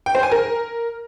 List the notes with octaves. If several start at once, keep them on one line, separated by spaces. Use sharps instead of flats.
G5
C5
G#5
A#4